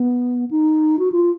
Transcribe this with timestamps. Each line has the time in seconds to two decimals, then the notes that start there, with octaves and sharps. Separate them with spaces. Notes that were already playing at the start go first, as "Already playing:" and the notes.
Already playing: B3
0.51 D#4
0.99 F#4
1.12 F4